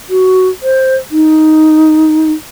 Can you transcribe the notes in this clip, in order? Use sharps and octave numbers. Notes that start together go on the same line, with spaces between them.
F#4
C5
D#4